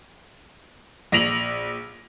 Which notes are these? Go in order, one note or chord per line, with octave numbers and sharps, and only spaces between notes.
A#1 A#6 F7 F#7